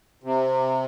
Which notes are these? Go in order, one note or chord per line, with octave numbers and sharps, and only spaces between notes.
C3